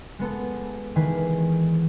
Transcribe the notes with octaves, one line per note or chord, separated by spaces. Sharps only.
G#3 B3 A4
D#3 E3 G#4 B4